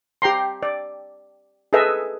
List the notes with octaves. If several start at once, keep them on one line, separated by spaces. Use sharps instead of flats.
G4 G5 A#5 C6
D5
G#4 A4 B4 D#5 E5